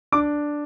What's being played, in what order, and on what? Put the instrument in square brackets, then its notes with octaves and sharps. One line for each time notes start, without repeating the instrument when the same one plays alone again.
[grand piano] D4 D6